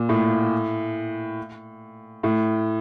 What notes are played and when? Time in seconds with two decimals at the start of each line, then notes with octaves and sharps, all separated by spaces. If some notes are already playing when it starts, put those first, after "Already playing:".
Already playing: A#2
0.09 A2
2.23 A2